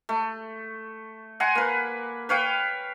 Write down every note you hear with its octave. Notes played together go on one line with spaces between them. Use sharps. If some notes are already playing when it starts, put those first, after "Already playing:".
A3
F#5 G#5 A#5 C6
A#3 B4
B4 C#5 F5 G5